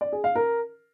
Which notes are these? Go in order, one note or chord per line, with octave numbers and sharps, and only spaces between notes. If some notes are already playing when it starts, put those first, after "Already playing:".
D5
G#4
F5
A#4